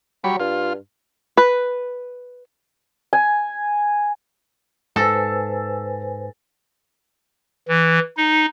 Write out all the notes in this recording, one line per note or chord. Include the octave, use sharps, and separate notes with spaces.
F#3 G3 C#5 B5
G2 F4
B4
G#5
G#2 A4 B4 C5 G#5 E6 A6 A#6
E3
D#4